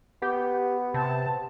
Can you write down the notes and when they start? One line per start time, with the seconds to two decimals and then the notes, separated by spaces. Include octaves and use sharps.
0.22 B3 G4
0.94 C3 A5